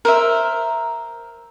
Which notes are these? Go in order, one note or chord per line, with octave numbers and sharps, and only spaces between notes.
A#4 C5 E5